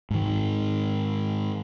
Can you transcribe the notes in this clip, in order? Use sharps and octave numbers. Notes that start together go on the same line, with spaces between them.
G#2 D#3